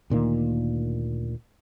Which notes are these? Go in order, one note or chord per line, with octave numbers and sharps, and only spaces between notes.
D2 A#2 D#3 A#3